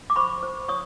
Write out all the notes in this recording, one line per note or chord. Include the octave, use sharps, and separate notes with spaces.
D6
C5 B5 C#6
C5
C#5 C#6 D#6